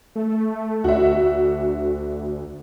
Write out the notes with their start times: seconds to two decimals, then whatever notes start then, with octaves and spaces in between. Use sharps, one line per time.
0.15 A3
0.84 D2 F#4 E5